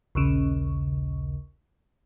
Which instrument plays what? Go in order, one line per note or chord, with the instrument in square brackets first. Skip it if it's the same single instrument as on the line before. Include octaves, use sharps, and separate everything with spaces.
[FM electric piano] A#1 D#2 C#3